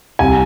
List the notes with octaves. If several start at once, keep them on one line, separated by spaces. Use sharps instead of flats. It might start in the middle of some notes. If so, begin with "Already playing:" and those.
C2 G#5